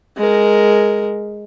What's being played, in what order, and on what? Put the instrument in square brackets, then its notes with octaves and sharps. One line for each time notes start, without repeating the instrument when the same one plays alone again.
[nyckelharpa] G#3 A#4